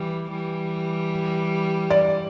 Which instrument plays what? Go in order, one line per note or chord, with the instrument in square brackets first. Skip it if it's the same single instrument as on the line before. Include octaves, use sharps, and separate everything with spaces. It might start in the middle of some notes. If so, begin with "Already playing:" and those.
Already playing: [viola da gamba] E3 G3
E3 G3
[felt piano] D5